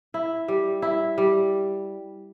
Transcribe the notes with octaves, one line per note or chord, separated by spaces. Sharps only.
E4
G3
E4
G3